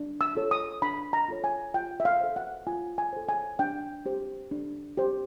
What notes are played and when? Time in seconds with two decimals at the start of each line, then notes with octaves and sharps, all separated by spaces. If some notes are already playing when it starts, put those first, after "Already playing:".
Already playing: D4
0.21 E6
0.35 F4 A4 C#5
0.51 D#6
0.82 D4 B5
1.13 A#5
1.28 F4 A4 C#5
1.44 G#5
1.74 F4 G5
2.00 E5
2.05 F5
2.20 A4 C5
2.36 F#5
2.67 F4 G#5
2.98 G#5
3.13 A4 C5
3.29 G#5
3.59 D4 G5
4.06 G4 C5
4.51 D4
4.97 G4 C5